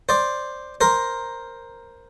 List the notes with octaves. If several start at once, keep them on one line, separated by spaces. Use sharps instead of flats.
C5 D5
A#4 C5